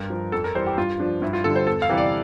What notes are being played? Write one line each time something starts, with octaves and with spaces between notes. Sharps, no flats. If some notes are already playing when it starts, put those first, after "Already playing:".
Already playing: G2 A#4
F3
F2 A4
A#4
E3 G3 C5
G4
G2 F4
F3 D4
G2 E4
F4
D3 G3 A4
C5
E2 A4
F5
C3 E3 G3
D5